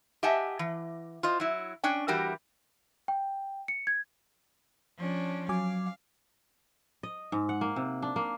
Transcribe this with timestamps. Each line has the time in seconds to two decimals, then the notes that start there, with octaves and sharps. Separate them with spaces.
0.23 G4 D#5 E5 F#5 G#5 A5
0.59 E3
1.23 F4 C5 D#5
1.40 F#3 E4
1.84 C#4 D4 G5
2.08 E3 G3 F#4 G4 A#4
3.08 G5
3.68 C#7
3.87 G#6
4.99 F3 C#4 D4
5.49 F#3 F5 G#5 D6
7.03 D#5
7.32 G#2
7.49 F#5
7.61 A#3
7.76 C3
8.02 D4
8.16 A#3